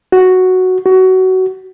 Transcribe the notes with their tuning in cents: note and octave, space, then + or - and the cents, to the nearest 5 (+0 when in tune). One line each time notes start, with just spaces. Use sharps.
F#4 +0
F#4 +20